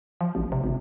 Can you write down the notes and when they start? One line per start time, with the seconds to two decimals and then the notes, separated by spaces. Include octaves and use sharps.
0.21 F3
0.35 A1
0.52 C3
0.64 G#1